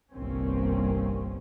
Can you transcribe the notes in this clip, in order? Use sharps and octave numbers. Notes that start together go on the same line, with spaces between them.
G1 C2 D#3 A#3 C4 C#4